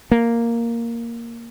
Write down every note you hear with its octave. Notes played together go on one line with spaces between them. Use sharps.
A#3